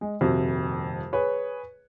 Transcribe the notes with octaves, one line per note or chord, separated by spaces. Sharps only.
G#3
D#1 F2 C3 F#4
G#4 B4 C#5